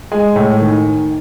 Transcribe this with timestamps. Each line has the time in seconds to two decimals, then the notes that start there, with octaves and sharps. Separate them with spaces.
0.12 G#3 G#5
0.36 A2
0.60 D#3